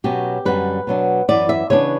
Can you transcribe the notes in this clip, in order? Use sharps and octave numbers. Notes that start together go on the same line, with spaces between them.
B2 F#3 C#4 G4
F#2 D3 G3 B4
B2 F#3 B3 D4
F#2 E3 B3 D5
E5
C#3 E3 B3 D4 C#5